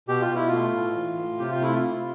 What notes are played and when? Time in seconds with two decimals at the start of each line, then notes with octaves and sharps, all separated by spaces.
0.08 B2 G4
0.21 F4
0.29 B2
0.35 E4
0.48 A3 F4
0.74 A2
0.95 E3
1.17 A2
1.38 C3 G4
1.51 F4
1.60 A3 E4
1.75 F4
1.82 C3